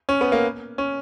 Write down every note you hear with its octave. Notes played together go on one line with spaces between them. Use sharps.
C#4
B3
A#3
C#4